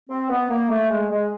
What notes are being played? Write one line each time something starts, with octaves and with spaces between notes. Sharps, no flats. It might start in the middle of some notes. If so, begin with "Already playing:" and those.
C4
B3
A#3
A3
G#3
G#3